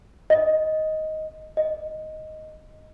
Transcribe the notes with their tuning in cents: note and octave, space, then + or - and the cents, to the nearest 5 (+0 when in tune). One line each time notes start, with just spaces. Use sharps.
D#5 +10
D#5 +5